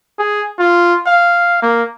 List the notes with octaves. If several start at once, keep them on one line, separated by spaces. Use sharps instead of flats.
G#4
F4
F5
A#3